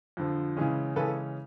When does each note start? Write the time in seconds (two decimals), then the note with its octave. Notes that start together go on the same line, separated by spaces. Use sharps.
0.17 F2 D3 F3
0.57 C#3 E3 G#3 C#4
0.96 C#3 E3 G#3 C#4 A4 B4